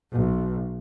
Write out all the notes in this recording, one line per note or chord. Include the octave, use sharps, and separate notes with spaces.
B1